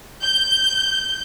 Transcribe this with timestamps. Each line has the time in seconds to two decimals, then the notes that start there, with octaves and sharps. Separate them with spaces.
0.24 G6